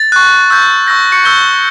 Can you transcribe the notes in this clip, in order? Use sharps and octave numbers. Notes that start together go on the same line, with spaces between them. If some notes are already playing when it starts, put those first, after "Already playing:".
Already playing: A6
C#6 F#6
C#6 E6 G6
C#6 E6 G6 A#6
C#6 C#7
C#6 E6 G6 G7